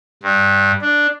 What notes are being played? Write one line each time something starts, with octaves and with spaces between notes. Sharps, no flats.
G2
D4